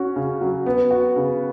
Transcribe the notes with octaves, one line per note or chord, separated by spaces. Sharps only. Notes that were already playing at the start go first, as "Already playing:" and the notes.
Already playing: C#4 F#4
C#3
F#3
B3
F#4
C#3